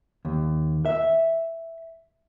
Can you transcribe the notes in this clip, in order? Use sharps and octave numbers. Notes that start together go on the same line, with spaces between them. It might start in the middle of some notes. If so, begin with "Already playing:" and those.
D#2
E5